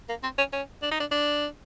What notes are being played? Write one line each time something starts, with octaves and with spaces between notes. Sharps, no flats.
A#3
C4
C#4
C#4
D4
D#4
D4
D4